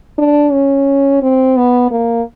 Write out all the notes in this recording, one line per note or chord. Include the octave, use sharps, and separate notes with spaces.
D4
C#4
C4
B3
A#3